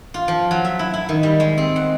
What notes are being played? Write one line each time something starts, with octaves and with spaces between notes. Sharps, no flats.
F4
F3
F#3
E5
E4
E4
D#3
G3
G#3
C4
F#5